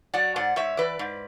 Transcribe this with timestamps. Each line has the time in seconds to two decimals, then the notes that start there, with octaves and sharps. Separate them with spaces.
0.14 F#3 D5 F#5
0.36 G#2 D5 F#5
0.56 G#2 C#5 E5
0.77 E3 B4 D5
0.99 G#2